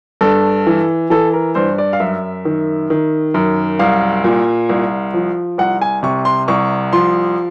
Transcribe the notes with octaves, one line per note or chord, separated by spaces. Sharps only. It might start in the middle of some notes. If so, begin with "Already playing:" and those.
G2 A4
E3
E3 A4
A#4
G2 C5
D5
F5
F#2 E5
D#3
D#3
F#2
C2 F5
A#2
C2
F3
C2 F#5
G#5
C3 C#6
C6
C2 C#6
F3 C6